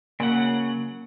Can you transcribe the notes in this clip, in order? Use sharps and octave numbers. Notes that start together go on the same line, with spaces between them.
C#3 F#3 A#3 F#5